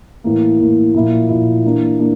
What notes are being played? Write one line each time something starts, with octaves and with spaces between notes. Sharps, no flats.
A2 E3 A#3
A2 E3 A#3
A#2 F3 A#3 E4
A#2 F3 A#3 E4
E3 A#3 D4
A#3 D4